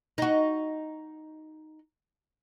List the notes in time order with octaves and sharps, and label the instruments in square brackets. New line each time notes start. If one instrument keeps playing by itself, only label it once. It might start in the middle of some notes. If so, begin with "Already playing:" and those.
[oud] D#4 F#4